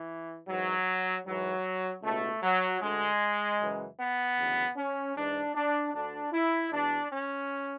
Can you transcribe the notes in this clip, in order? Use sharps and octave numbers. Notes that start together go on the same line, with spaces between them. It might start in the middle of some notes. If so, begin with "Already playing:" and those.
Already playing: E3
G#2 E3 F#3
G#2 E3 F#3
C#2 B2 A3
F#3
D2 D3 G#3
F#2 C#3 E3
B3
D2 C#3 E3
C#4
G#2 E3 D4
D4
D2 D3 D4
E4
E2 B2 D4
C#4